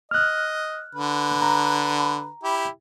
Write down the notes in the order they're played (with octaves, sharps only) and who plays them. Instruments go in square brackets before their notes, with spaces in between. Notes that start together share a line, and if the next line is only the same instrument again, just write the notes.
[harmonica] D#5 [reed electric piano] F6 F#6
[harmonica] D3 B4
[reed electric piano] A#5
[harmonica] E4 G4